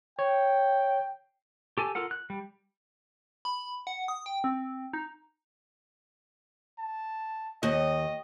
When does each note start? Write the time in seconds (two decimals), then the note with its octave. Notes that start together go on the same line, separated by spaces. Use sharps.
0.19 C#5 G5
1.78 G4 A4 G#5
1.95 F4 A4 A#4 F#5
2.11 F#6
2.30 G3
3.45 B5
3.87 F#5
4.08 D#6
4.26 G5
4.44 C4
4.93 D#4
6.79 A5
7.63 D#2 D#5